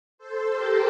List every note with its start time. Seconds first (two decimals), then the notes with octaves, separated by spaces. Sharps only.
0.18 A4 C5
0.51 G4 A#4